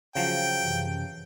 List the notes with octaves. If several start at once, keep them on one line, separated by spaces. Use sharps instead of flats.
C#3 F3 F#3 G5
F#2 C3 E3